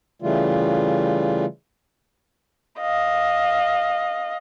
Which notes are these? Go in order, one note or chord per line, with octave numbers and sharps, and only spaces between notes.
C#3 E3 G3 A3 F4
D#5 F5